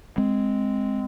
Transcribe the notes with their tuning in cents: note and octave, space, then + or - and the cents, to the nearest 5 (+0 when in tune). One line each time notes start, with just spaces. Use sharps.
G#3 +0 C4 +0